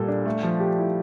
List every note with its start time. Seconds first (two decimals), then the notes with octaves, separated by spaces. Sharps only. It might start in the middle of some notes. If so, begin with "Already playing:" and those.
Already playing: A#2 G3 A4
0.08 D4
0.25 A3
0.43 F3
0.60 G4
0.79 E4